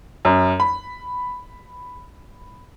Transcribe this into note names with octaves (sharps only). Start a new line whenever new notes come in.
F#2
B5